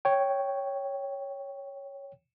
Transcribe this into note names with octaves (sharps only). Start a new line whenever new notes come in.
C#5 G5